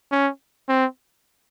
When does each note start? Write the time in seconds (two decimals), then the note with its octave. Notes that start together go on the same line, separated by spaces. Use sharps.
0.12 C#4
0.69 C4